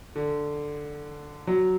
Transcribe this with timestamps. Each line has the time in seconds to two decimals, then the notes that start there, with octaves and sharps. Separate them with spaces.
0.16 D3
1.47 F#3